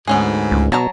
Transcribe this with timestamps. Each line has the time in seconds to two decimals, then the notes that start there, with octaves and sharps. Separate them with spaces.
0.07 D2 G#2 B3 C#4 G#4
0.51 C#2
0.72 B2 F#3 A5 A#5